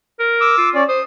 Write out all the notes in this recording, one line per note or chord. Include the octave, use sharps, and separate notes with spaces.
A#4
D6 E6
F4
C#4 D5
C5 D#6